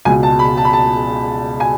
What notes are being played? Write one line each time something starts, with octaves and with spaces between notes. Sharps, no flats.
C#2 B2 G#5
A5
B5
A5
B5
A5
G#5